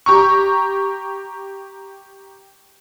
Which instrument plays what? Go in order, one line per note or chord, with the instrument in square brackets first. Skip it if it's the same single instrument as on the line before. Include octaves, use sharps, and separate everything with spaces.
[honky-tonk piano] G4 A#5 C#6